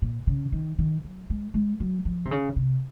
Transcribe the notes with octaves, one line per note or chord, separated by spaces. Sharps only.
A#2
C#3
D#3
D#3
F#3
G#3
G#3
F#3
F3
C3
C#3
C3